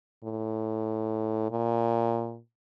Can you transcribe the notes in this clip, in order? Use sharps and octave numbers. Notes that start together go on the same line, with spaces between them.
A2
A#2